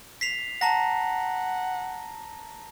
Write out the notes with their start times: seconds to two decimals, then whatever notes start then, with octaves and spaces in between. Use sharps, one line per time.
0.21 B6 C7 F7
0.61 F#5 A5 A#5 A#6